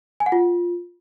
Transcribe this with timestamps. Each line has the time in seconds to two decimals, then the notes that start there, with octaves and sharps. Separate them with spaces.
0.20 G#5
0.26 F#5
0.32 F4